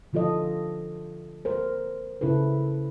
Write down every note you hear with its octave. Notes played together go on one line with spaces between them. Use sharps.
D3 F3 F4 A4 D#5
A#4 C5
C#3 E4 A4 B4